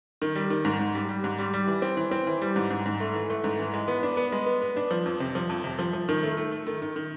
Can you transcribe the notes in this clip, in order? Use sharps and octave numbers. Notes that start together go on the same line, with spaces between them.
D#3
G3
D#3
G#2
G#2
G3
G3
G#2
G3
G3
E3
C4
E3
C4
E3
G3
G#2
G#2
G#2
A3
E3
A3
G#2
E3
G#3
B3
D4
B3
G#3
B3
B3
D4
F3
F2
C3
F3
F2
C3
F3
F3
D#3
A3
A3
A3
D#3
D#3
D#3